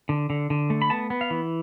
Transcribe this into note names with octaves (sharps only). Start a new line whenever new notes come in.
D3
D3
D3
A3
B5
B3 A5
B3
F5
E3